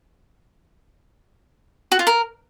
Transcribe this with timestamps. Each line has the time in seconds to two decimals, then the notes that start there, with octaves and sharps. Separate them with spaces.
1.92 F#4
1.99 F4
2.07 A#4